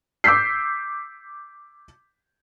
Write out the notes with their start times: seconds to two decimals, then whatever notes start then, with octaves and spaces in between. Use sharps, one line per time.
0.24 D6 E6 G6 B6 C7